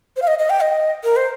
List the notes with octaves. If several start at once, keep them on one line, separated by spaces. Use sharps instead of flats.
C5
F5
D#5
D#5
G5
D#5
A#4
C5